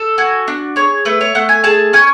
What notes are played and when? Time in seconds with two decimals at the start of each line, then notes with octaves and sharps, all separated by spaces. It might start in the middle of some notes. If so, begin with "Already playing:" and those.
Already playing: A4
0.18 F#4 G#5
0.48 D4
0.76 G#4 C#5
1.05 A3 B4
1.21 C#5
1.35 A3 F#5
1.49 G#5
1.64 G#4 A5
1.93 C#4 G#5